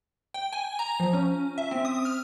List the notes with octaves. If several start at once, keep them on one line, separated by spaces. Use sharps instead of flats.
G5
G#5
A#5
F3
C#4
E5
C4
D#6
F6